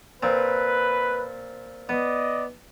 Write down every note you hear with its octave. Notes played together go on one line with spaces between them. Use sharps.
A#2 C4 B4
B3 D5 D#5